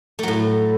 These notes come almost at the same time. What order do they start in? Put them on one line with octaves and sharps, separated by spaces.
A3 F#3 A2